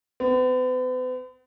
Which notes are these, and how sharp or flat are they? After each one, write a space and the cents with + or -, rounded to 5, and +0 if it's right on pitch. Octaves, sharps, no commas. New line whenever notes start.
B3 +45